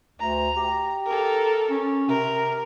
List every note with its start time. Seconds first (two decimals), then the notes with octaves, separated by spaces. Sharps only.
0.20 D2 A#5
0.57 G4
1.06 A4 A#4
1.70 C#4
2.08 C3 A#4